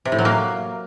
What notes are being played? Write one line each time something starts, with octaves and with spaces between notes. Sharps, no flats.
C3
A2
F#3
A#3